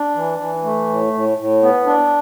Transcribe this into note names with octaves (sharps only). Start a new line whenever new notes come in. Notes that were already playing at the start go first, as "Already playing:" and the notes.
Already playing: D4
E3
E3
A3
A2
A2
A2
B3
D4